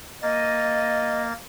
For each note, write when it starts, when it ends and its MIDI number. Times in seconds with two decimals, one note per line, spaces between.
0.23 1.33 58
0.23 1.23 75
0.23 1.33 93